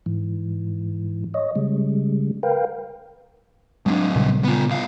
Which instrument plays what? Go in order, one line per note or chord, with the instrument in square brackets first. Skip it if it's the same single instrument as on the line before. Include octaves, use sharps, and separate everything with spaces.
[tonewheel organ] G#2 E3
C#5 D#5
C#3 G3 G#3
A#4 B4 F5 G5
[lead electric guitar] F#3 C4 [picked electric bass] G#3 D4
[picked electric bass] A#2 C#3 G3
[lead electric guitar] B3 F4
C2 F5